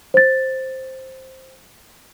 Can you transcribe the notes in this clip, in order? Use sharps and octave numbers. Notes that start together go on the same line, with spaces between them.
C5 A6